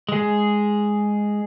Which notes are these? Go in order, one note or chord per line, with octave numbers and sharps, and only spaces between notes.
G#3 G#4